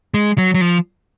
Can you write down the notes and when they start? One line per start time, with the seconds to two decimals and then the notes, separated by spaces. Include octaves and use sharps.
0.14 G#3
0.38 F#3
0.54 F#3
0.61 F3